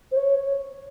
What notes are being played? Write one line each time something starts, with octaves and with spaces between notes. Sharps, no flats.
C5
C#5